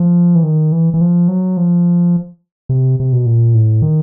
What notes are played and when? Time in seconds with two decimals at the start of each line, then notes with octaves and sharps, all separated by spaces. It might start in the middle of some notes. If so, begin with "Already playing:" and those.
Already playing: F3
0.35 E3
0.43 D#3
0.72 E3
0.94 E3
1.01 F3
1.28 F#3
1.57 F3
2.69 C3
3.00 C3
3.13 B2
3.26 A#2
3.55 A2
3.82 D#3